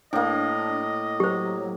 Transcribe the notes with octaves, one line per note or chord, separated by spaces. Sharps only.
A2 A#3 D4 D#5
F#3 G4 C5